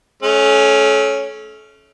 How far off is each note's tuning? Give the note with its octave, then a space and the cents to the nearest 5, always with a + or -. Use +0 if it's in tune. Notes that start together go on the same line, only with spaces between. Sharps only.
A3 -35 C#4 +0